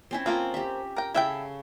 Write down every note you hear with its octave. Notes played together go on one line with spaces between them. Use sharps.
C4 C#4 E4
F3 A#3 C4 F4 A4
G4 E5
A#4 G5
C#3 E4 A4 E5 G5